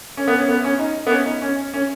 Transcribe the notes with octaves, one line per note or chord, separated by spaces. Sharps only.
C#4
B3
C#4
B3
C#4
D#4
B3
C#4
D#4
C#4
C#4